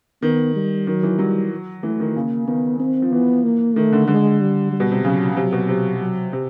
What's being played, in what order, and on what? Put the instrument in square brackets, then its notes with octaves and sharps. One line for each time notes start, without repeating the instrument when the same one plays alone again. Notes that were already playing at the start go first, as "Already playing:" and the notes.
[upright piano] D#3 [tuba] B3
[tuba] G3
[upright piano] D#3 [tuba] F#3
[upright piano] E3
[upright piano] F#3 [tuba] G3
[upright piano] E3 [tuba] A3
[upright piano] D#3
[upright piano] C#3 [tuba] A#3
[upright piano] D#3 [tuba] B3
[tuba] C4
[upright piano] F3
[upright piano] E3 [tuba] B3
[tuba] A#3
[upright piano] D#3 [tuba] A3
[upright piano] D3
[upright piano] D3 [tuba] G#3
[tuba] G3
G3
[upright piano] B2
C3
[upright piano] C#3 [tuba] F#3
[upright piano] C3 [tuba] F#3
[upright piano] B2
C3
[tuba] F#3
[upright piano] C3